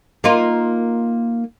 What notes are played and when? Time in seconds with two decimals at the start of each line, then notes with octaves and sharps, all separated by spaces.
0.24 A#3 D#4 F4